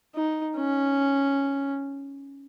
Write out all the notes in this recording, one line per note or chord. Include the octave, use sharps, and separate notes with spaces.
D#4
C#4